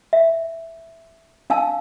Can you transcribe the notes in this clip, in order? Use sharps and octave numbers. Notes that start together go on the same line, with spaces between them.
E5
D4 F5 G#5 A5 E6